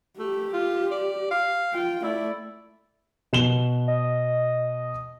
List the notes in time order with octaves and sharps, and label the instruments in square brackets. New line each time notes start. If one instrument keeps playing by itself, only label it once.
[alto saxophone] A3 [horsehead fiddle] G4
[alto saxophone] F4
D5
F5
[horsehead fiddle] F4 G5
[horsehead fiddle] A3 D5 [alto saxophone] E4
[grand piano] B2 E7 G7
[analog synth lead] D#5